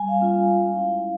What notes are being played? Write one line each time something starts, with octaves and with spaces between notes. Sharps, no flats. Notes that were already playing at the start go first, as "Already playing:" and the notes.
Already playing: G3 G#5
F5
A#3 C#4 F4
F5
G#3
C#4 E4